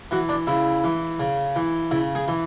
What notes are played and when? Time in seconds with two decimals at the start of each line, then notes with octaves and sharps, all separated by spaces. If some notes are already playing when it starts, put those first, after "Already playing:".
0.11 E3 F#4
0.29 D4
0.47 C#3 E4
0.84 E3
1.20 C#3
1.56 E3
1.91 C#3 E4
2.15 G#4
2.28 E3